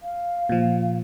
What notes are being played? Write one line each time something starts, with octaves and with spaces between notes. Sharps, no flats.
F5
A#2 F3